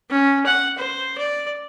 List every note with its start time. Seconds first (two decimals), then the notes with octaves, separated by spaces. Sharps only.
0.10 C#4
0.46 F#5
0.78 C5
1.18 D5